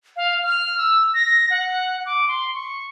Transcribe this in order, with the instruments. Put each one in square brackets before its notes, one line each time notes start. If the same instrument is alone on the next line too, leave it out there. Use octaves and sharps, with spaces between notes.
[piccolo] F5
F6
E6
A#6
F#5
D6
C6
C#6